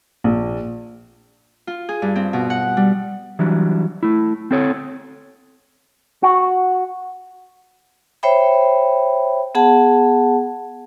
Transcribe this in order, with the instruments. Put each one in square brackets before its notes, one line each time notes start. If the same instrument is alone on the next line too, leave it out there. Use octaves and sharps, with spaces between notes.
[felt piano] A#1
[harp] F4
G#4
G2
C4
B2
F#5
G3
[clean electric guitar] E3 F#3 G3 D4
A3 E4
C4 A4 C#5
F#4
[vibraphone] C5 C#5 E5 G5 B5
B3 G#4 F#5 A5